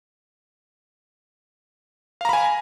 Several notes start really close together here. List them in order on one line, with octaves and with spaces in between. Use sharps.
F5 A#5 B5 G#5